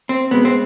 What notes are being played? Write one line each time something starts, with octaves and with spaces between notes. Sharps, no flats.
C4
B2 G#3 B3
C4